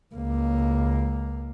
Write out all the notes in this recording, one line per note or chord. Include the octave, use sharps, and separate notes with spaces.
C#2 A#3